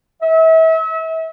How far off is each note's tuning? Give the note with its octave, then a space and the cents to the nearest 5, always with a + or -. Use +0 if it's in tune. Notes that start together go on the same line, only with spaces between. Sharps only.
E5 -35